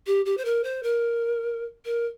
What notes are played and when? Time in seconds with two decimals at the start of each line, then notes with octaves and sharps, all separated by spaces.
0.07 G4
0.26 G4
0.37 C5
0.45 A#4
0.64 C5
0.83 A#4
1.85 A#4